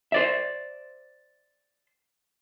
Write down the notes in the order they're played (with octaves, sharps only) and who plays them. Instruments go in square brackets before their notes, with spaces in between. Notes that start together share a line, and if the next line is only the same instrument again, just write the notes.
[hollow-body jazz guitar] C5 D5 E5